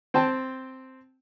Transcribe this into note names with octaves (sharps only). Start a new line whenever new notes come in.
C4 G5 A5